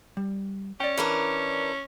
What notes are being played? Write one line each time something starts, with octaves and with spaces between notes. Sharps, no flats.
G3
C#4 D5 G5
E3 D4 A#4